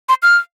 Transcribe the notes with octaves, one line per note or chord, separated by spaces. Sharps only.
C6
F6